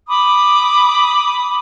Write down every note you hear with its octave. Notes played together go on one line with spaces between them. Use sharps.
B5 D6 D#6